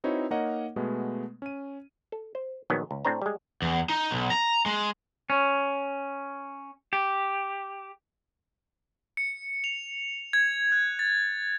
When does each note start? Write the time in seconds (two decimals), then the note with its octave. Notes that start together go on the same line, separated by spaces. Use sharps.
0.04 C4 D#4 E4 F#4 B4 C#5
0.31 A#3 D#4 A#4 C#5 D#5 F#5
0.76 B2 G#3 A3 B3
1.42 C#4 D#7
2.12 A4
2.35 C5
2.70 A#1 D#3 F#3 B3 D#5
2.91 C#2
3.05 A2 C4 D4 C5 A#5
3.22 G3 G#3
3.62 E2
3.89 D#4
4.11 B1
4.31 A#5
4.66 G#3
5.30 C#4
6.93 G4
9.17 C#7
9.64 F7
10.33 G#6
10.72 F#6
10.99 A6